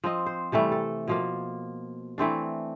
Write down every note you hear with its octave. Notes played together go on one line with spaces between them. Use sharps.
F3 C4 D#5
C5
C3 E3 G3 A3
A4
B2 F3 A#3
E3 A3 C4 D4